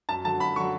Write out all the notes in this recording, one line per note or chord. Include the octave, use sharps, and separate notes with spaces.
F#2 A5
D3 F#3 A5
F#2 B5
D3 F#3 C#6